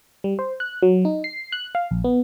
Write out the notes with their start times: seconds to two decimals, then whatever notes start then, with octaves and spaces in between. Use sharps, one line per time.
0.24 G3
0.39 C5
0.60 F#6
0.82 F#3
1.05 D#4
1.24 C7
1.52 F#6
1.75 F5
1.91 A#1
2.04 B3